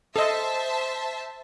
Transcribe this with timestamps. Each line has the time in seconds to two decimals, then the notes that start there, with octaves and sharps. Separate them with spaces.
0.16 A4 C5 D#5 E5 A5